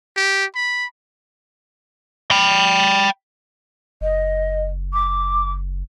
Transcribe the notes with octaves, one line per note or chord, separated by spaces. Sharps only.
G4
B5
G5 B5
F#1 D#5
D6